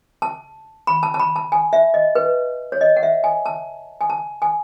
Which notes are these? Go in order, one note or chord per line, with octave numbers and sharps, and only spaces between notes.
A5
B5
A5
A5
B5
A5
G#5
E5
D#5
B4
C#5
D#5
F#5
E5
G#5
A5
G#5
A5
G#5